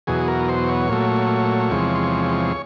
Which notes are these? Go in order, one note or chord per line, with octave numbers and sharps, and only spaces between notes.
E2 B2 F#3 G#4
A#4
C5
C#5
A#2 F#3 A3
E2 C3 F3 G#3